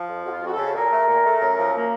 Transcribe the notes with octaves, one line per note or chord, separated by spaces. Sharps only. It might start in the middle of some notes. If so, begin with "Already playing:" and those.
Already playing: F3
F2
F2 F#4
F4
F2 F#4
A4
C#3
A#2 A#4
A3
A#2
A3
F#2
F3
A#3